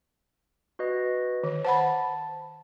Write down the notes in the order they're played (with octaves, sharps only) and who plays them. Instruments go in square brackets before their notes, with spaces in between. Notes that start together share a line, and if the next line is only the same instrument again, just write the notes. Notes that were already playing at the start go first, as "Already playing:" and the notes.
[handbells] F#4 B4 D#5
[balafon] D#3
[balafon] C5 F#5 B5 [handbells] A5